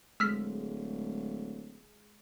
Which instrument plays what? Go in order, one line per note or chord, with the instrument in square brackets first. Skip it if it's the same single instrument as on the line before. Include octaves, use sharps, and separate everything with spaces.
[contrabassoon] D1 [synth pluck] G#3 [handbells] E6 F6 B6